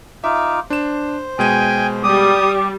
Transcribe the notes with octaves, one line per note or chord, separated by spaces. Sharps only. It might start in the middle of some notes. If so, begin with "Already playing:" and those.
D#4 F4 E5 D6
D4 C5 E7
B2 G#3 G5 G#5 D#7
G3 G4 D6 D#6